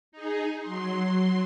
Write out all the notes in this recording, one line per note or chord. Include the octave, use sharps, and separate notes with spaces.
D#4 G#4
F#3 C6